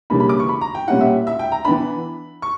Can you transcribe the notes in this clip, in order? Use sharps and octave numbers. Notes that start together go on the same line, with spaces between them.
C#3 E3 G3 A#3 D4 B5
B5
D6
C#6
B5
A#5
G5
A#2 G3 C#4 E4 F#5
E5
E5
G5
A#5
E3 B3 D4 B5
C#6